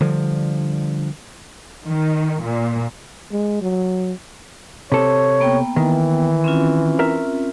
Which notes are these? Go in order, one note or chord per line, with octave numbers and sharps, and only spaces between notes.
D3 F3 G3
D#3
A#2
G#3
F#3
C3 A4 C#5
A#3 B3 G5
D#3 E3
C4 C#4 F4
A#4 E5